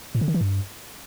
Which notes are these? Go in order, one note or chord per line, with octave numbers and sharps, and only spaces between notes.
A2
D3
D#3
E3
G2